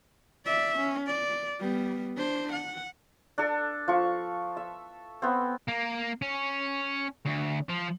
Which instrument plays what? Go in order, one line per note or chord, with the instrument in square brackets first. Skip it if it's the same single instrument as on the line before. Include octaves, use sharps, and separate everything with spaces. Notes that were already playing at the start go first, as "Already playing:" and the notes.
[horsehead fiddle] D5 E5
C#4
D5
G3 B3
D4 C5
F#5
[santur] D4 A4
F3 C#6
E5
B3 C4
[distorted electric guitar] A#3
C#4
D2
F3